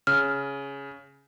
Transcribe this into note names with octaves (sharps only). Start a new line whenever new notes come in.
C#3 F6